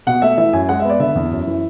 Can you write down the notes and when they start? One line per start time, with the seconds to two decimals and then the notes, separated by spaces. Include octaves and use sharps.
0.07 B2 F#5
0.22 A3 E5
0.38 E3 E5
0.53 F#2 G#5
0.69 G#3 F#5
0.80 E5
0.85 B3 D5
1.00 D3 E5
1.15 E2
1.31 F#2
1.47 E3